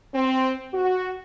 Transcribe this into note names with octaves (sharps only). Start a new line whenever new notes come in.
C4
F#4